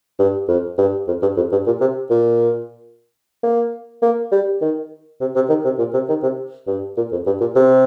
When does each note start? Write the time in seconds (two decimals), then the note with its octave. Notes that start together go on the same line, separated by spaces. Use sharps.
0.19 G2
0.48 F2
0.78 G2
1.08 F2
1.22 G2
1.37 F2
1.52 G2
1.67 A#2
1.81 C3
2.10 A#2
3.43 A#3
4.03 A#3
4.32 G3
4.61 D#3
5.21 C3
5.36 C3
5.49 D#3
5.65 C3
5.79 A#2
5.94 C3
6.09 D#3
6.23 C3
6.67 G2
6.97 A#2
7.12 F2
7.26 G2
7.41 A#2
7.56 C3